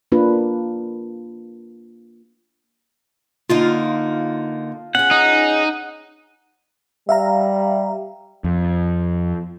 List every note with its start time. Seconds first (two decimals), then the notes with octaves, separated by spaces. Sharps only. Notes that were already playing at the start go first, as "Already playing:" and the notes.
0.12 A#3 D4 F4 B4
3.50 D3 A#3 D#4 F4
4.95 C#4 G#4 F#5
5.11 D#4
7.09 G3 E5 F5 A#5
8.44 F2